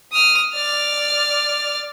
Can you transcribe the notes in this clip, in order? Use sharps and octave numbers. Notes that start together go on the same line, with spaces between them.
D#6 F6
D5 F6